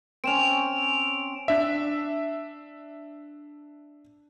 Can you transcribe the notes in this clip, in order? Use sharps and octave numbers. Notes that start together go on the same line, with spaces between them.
C4 C#4 D7 E7 F7
D4 E5